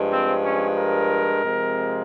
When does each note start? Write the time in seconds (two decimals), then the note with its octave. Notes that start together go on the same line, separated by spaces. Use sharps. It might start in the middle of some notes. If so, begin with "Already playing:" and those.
Already playing: G2 F3 G#3
0.11 C4
0.44 C#4
0.77 A#4
1.43 C3 F3 G#3